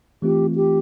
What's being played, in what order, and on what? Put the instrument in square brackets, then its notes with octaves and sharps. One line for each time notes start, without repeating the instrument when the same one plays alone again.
[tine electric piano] E3 A3 C4 F4 [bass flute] G4
[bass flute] G4